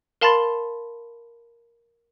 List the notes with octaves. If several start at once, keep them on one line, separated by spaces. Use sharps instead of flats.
A#4 F5 A5 B5 C6 A6